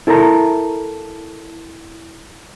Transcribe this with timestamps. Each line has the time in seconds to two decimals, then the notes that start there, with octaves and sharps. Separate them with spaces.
0.07 E4 A4 A#4 E5 A#5